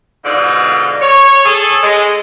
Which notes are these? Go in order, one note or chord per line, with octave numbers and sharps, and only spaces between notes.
G#2 B2 D3 D4 D#4 F4
C#5
G#4 A4
G#3